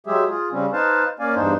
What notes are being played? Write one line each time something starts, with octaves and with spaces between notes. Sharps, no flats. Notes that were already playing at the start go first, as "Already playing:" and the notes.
F#3 G#3 G4 G#4 E5
F4 G#4
C#3 G3 C4 C#4
D#4 B4 C5 F5 A5
A#3 C#4 D5 F5 G#5
E2 G2 D4 D#4 C5